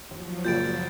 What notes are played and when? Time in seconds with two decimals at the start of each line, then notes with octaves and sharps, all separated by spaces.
0.11 D#2 F3 F#3
0.45 F#1 C#2 A#2 D5 G6 A6 D7